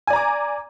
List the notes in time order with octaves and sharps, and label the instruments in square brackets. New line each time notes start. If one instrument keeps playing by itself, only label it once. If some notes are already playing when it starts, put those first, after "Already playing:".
[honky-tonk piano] G#5
D5
A#5
D6